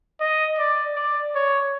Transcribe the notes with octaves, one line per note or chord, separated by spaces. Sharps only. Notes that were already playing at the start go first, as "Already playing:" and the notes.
D#5
D5
D5
C#5